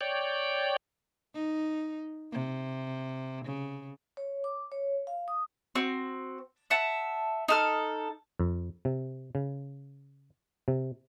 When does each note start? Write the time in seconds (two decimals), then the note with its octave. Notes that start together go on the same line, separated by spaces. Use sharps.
0.01 C#5 D5 G5
1.34 D#4
2.32 C3
3.45 C#3
4.17 C#5
4.44 D6
4.72 C#5
5.07 F5
5.28 D#6
5.75 C4 F#4
6.70 E5 F#5 A5
7.48 D#4 A4 F6
8.39 F2
8.85 C3
9.35 C#3
10.68 C3